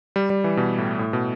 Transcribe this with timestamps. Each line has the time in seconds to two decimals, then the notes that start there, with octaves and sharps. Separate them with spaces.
0.16 G3
0.30 G3
0.44 E3
0.57 B2
0.78 A2
0.99 A2
1.13 B2